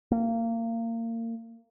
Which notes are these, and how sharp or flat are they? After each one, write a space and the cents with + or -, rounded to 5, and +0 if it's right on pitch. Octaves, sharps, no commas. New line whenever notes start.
A#3 -30